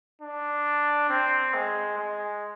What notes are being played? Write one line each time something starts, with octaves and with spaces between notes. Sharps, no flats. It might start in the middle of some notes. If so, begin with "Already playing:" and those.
D4
C4
G#3
G#3